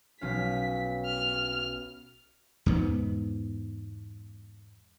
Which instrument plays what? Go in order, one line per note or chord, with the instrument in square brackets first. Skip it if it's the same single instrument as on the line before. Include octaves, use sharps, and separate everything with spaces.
[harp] B1 C#4 F5 [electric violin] B6
[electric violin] F6
[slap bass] E2 G#2 B3